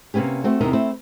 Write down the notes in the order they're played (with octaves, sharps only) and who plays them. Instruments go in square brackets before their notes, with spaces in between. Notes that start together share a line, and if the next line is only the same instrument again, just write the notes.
[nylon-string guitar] C3 A#3 B3 C#4 G4
A3 C4 F#4
E2 C3 D#4 A#4
A3 C4 E4